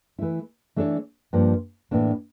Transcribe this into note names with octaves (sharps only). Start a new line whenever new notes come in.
E3 A3 E4
E3 A3 D4 A4 C#5
G2 F3 A#3
A2 E3 A#3 D4